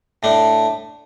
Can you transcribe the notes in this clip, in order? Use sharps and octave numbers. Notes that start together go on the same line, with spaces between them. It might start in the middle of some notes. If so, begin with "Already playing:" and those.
A2 A3 D4